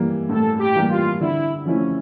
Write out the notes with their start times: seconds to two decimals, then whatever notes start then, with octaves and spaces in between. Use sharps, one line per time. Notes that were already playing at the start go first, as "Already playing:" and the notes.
Already playing: E3 G3 A#3
0.29 A2 A4
0.60 G4
0.75 E3 G3 A#3
0.90 F4
1.20 D3 E4
1.66 F3 A3 C#4 E4